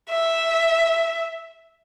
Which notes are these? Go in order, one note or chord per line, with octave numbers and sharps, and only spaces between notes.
E5